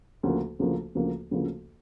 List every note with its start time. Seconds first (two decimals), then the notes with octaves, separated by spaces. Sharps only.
0.23 D2 C#3 F3 A#3
0.59 D2 C#3 F3 A#3
0.95 D2 C#3 F3 A#3
1.31 D2 C#3 F3 A#3